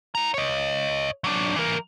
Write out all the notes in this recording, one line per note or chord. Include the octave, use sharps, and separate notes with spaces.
E4 A#5
C#5 D#5
F#3 D4
E3 A#4